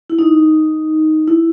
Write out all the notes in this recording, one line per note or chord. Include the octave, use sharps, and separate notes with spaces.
E4
D#4
E4